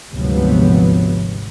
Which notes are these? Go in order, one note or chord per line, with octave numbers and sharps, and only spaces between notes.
G#1 D2 C3 F3 F#3 B3